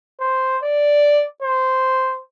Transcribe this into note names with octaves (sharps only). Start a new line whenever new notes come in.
C5
D5
C5